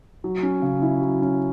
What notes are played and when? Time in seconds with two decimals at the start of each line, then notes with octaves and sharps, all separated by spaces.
0.24 F#3
0.43 C#4
0.62 C#3
0.82 E4
1.01 F#3
1.22 C#4